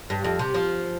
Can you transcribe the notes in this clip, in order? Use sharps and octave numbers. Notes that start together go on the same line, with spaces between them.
G2
F2
C3
F3